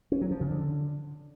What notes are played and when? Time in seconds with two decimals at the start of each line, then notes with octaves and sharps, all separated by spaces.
0.12 C#4
0.21 F#3
0.31 F3
0.41 C#3
0.50 D3